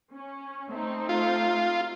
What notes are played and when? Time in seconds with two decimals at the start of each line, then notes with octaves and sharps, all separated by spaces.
0.14 C#4
0.70 A3 C4 D#4
1.09 F4